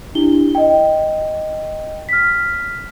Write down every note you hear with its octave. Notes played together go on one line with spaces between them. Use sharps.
D4 E4 G4 G7
D#5 G5
F6 B6